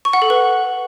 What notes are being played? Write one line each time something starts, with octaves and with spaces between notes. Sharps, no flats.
C#6
F#5
A4
B4